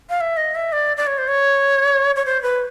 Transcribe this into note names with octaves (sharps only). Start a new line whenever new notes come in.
F5
E5
D#5
E5
D5
D5
C#5
C5
C#5
C#5
C5
B4